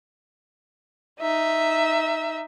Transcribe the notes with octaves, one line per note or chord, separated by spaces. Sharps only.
D#4 E5